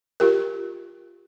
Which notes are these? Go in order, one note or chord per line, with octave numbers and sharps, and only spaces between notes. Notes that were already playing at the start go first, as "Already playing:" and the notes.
F4 G4 A#4